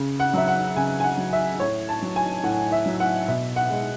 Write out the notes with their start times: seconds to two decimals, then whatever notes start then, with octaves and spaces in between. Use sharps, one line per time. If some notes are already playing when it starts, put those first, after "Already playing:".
Already playing: C#3
0.20 F#5
0.34 F#3 E5
0.48 F#5
0.76 C#3 G#5
1.00 G#5
1.04 F#5
1.18 F#3
1.33 E5
1.59 A2 C#5
1.89 A5
2.02 F#3
2.16 G#5
2.43 A2 F#5
2.72 E5
2.86 F#3
3.00 F#5
3.28 B2 E5
3.56 F#5
3.70 G#3